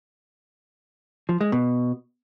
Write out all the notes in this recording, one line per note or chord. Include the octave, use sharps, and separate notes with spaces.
F3
G#3
B2